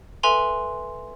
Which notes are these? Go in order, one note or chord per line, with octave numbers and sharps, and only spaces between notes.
A4 B4 E5 G#5 C6 F7